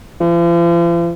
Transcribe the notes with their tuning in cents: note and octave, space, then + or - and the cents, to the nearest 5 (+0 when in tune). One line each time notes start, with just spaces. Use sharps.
F3 -45